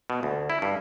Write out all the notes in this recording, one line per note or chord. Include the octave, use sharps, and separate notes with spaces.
B2
D2
E4
G2